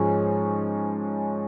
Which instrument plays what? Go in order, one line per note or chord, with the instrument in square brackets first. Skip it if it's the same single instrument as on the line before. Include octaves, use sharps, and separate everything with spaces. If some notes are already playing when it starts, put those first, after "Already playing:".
Already playing: [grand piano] G#2 F3 G#3 [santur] C#4